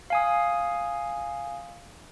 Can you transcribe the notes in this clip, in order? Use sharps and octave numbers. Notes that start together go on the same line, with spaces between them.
F5 G#5 D#6